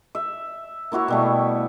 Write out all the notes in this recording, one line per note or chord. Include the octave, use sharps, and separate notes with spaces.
E5
A#3 E4 F#4 C#5
B2 G3 A3